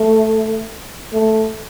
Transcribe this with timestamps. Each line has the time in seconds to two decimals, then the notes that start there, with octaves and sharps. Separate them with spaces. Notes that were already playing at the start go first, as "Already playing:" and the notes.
Already playing: A3
1.13 A3